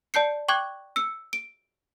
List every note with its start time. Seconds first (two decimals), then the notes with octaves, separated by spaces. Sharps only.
0.14 D5 A5 G6 C7 C#7
0.48 G5 C#6 D6 F#6 G#6
0.96 E6 C#7
1.33 D7